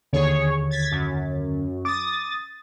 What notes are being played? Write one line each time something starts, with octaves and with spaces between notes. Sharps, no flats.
D#2 D3 G#4 C#5
G#6 A6 B6
F#2
D6 D#6 A6